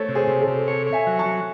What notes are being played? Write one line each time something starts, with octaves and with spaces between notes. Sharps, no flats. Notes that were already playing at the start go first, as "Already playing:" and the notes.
Already playing: A3 A4 C5 C#5
C3
G#4 C5
C3
A4
C3
A4 C#5
C#5
E5 G#5
F#3
A5 C#6
F#3